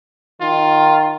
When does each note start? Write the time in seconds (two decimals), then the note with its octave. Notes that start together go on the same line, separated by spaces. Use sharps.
0.41 D#3 F4